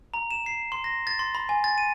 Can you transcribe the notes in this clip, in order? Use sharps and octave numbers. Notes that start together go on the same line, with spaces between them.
A#5
E7
C7
C6
A#6
A6
C6
B5
G#5
A6
D#7